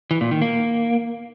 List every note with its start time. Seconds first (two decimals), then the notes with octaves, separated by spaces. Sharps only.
0.11 E3
0.21 A#2
0.31 D#3
0.42 A#3